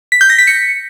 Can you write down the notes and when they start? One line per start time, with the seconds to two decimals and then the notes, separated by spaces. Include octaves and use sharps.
0.12 B6
0.21 G6
0.30 A#6
0.39 B6
0.47 C#7